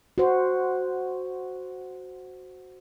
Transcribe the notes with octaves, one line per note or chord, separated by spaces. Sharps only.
F#4 C5